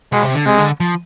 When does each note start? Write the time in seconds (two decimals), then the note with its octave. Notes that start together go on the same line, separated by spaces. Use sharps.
0.12 B2 G#3
0.23 C3
0.35 D3
0.45 C3 G#3
0.58 D3
0.80 F3